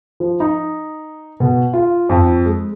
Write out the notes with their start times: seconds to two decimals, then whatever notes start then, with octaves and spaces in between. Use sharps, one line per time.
0.20 F3
0.40 D#4
1.40 B2
1.73 F4
2.09 F2
2.45 G#3